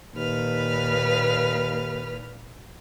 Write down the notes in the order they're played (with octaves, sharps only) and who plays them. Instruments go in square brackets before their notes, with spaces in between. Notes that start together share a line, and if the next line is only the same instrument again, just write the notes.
[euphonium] D#2 [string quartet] A#2 B4 F6